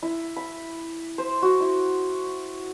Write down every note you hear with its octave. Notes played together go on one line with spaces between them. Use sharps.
E4
B5
C5
F#4
E4